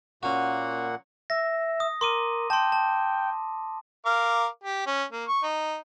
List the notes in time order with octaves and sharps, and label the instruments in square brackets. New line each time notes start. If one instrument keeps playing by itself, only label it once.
[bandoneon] A#2 A#3 F#5 [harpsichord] C#4 F#4
[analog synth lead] E5 [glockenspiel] A#6
[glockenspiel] D#6
[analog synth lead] A#4 [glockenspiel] C6 D6 D#7
[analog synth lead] G5 [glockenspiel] A5 C6
[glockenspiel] A5
[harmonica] A#4 F5 D6
G4
C#4
A#3
C#6
D#4